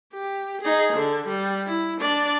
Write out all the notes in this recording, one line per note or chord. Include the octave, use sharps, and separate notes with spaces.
G4
D#4 G#4
D3
G3
E4
D4 D5